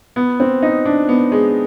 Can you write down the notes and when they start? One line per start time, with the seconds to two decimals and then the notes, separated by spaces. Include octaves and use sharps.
0.16 B3
0.40 C4
0.62 D#4
0.85 D4
1.09 B3
1.32 G#3